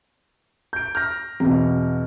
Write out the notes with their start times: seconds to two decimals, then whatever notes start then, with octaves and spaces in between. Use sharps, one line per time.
0.73 G6 D7
0.95 F6 G6 A#6
1.40 E2 B2 C4